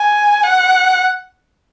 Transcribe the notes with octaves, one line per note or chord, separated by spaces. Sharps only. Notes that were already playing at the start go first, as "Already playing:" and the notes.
Already playing: G#5
F#5